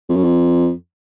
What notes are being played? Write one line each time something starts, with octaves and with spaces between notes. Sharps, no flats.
F2
F#2
F2